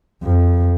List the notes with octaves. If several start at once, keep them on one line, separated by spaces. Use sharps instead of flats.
F2